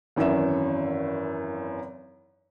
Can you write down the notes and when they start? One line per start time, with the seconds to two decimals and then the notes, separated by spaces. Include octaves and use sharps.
0.16 G#1 F#2 E3 C#5 E5 E7